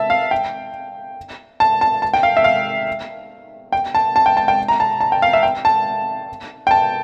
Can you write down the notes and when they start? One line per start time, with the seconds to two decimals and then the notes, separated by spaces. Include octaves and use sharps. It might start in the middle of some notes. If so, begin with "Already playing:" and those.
Already playing: E5 A5
0.10 F5
0.31 G5
1.60 A5
1.81 A5
2.02 A5
2.14 G5
2.23 F5
2.37 E5
2.44 F5
3.72 G5
3.95 A5
4.16 A5
4.26 G5
4.37 A5
4.48 G5
4.68 A#5
4.80 A5
5.00 A5
5.12 G5
5.22 F5
5.33 E5
5.43 G5
5.65 A5
6.67 G5
6.71 A5